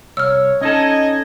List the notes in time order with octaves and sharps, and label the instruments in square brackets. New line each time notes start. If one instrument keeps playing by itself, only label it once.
[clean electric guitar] C2 [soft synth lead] C#5 [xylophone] E6 F6
[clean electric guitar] C#4 D#4 A4 [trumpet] D#5 [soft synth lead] G#6